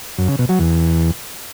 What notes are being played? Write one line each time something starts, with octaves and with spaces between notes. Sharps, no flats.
F#2
C#3
B2
F#3
E2